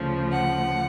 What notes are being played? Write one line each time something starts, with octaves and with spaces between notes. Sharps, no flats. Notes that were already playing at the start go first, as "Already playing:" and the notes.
Already playing: D2 C#3 F3
F#5